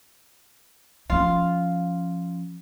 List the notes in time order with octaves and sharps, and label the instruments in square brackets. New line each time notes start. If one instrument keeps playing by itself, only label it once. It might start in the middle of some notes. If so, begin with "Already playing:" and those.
[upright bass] F3 C#4 [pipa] F4